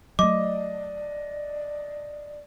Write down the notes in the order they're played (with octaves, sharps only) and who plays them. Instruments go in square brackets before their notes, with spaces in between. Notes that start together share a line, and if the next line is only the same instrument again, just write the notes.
[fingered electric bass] F#3 A3 [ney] D5 [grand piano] D#5 [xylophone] D6